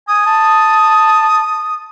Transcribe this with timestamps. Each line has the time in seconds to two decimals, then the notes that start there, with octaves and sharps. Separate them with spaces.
0.08 G#5 D#6
0.26 A5